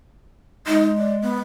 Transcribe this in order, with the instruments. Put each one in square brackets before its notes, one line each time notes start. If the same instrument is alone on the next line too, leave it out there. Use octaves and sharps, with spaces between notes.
[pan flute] G#3 [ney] D#4
[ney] D5
B3